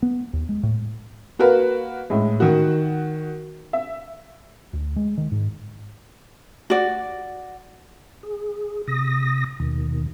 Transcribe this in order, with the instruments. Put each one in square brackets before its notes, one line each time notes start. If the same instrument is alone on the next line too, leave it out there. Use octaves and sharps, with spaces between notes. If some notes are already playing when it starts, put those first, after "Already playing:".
[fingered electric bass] B3
D#2
G#3
A2
[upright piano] A#3 F#4 A#4 B4
A2 G#3
D#3 F#4
E5
[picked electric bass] D2
G#3
D#3
G#2
[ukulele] F#4 D5
[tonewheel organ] G#4
C3 D#6 A#6
D#2 B2 D#3